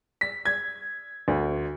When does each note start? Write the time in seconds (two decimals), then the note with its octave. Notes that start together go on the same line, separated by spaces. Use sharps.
0.21 B6
0.45 G#6
1.28 D2